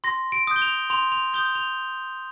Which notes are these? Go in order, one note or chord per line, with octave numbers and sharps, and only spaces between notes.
C6 A#6
D7
D#6 G6
G7
F7
C6 F7
F7
D#6 G6 G7
F7